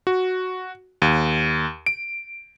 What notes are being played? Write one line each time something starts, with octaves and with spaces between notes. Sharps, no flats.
F#4
D#2
D7